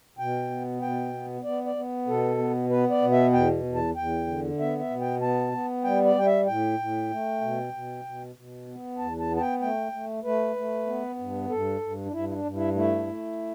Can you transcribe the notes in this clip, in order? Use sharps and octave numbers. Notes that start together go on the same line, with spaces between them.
B2 G5
B3
B2 G5
B3
B3 D5
D5
B3
B2 A4
B3
B3 B4
D5
B2
E5
E2 G5
E2
A5
E2 G5
D3
B3 E5
E5
B2
G5
B3 A5
B3
G3 G5
D5
G3 G5
E5
A2 G5
A2
A3
B2
B2
B2
B2
B3
E2 A5
A5
B3
A5
G5
A3 G5
A3
A3 B4
A3
B3
G2
G2 A4
G2
D4
G2 E4
E4
D4
G2
E4
A3 E4
A3